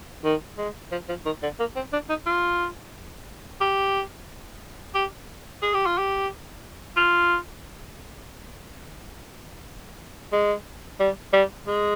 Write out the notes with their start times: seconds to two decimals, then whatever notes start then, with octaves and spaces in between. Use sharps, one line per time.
0.24 D#3
0.58 G#3
0.92 F3
1.09 F3
1.26 D#3
1.43 D3
1.59 A#3
1.76 C4
1.93 D4
2.09 D#4
2.26 F4
3.61 G4
4.95 G4
5.62 G#4
5.74 G4
5.86 F4
5.98 G4
6.97 F4
10.32 G#3
11.00 G3
11.33 G3
11.67 G#3